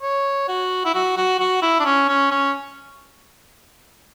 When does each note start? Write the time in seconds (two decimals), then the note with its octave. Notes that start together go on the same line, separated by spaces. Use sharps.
0.02 C#5
0.48 F#4
0.85 E4
0.95 F#4
1.17 F#4
1.39 F#4
1.62 E4
1.80 D4
1.85 C#4
2.09 C#4
2.31 C#4